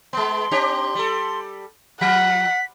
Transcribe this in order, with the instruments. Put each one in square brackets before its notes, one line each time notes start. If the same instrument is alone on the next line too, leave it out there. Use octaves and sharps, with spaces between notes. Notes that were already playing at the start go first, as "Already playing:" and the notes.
[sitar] G#3 B3 [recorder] C6
[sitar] C4 D4 G4
G3 A4
[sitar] F3 [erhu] F#5 [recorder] B6